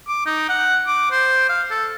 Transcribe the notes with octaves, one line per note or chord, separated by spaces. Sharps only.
D6
D#4
F#5
D6
C5
F5
A4